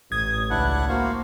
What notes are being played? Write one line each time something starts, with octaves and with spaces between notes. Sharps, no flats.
A1 D#6 G#6
C#2 D4 E4 F#5
A#3 F#4 C5 F5